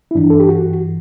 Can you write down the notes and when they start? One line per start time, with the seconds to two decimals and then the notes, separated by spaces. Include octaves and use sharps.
0.11 E4
0.15 G2 E3 D4
0.30 A4
0.40 G4
0.49 F#4